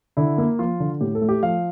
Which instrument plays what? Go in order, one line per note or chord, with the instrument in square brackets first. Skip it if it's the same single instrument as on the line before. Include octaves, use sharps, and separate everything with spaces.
[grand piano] D3 E4
A#3
F3 F4
D3
A2 G4
A4
A3
G4
F3 F5